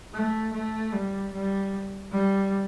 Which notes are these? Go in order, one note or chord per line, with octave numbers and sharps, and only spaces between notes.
A3
A3
G3
G3
G3